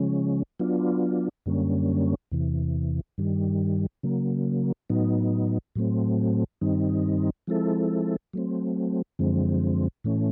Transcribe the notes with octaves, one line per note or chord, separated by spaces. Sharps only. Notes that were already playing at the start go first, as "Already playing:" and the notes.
Already playing: C#3 F3 G#3 C#4
F#3 B3 D4 F4
F#2 D3 G3 A#3 C#4
E2 C3 E3
G2 D#3 G3
C#3 F#3 A#3
A2 F#3 B3 D#4
A2 F#3 A3 C4
G2 D#3 G3 C4 D#4
F3 G#3 C4 E4 A4
F#3 A3 C4
F#2 D3 F3 G#3 C4
A2 E3 A3 C#4